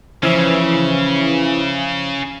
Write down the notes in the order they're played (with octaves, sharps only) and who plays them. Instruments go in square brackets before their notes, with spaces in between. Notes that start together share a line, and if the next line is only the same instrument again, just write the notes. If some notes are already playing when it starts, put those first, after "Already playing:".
[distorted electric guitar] C#3 [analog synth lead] E3 [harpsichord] F3 [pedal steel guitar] C#4 E5